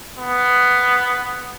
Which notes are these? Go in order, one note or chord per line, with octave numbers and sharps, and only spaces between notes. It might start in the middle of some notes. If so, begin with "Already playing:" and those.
B3